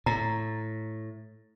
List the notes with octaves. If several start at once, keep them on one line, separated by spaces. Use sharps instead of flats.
A2 A#5